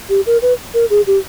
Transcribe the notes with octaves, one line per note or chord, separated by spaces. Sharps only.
G4
A#4
B4
A#4
G#4
G4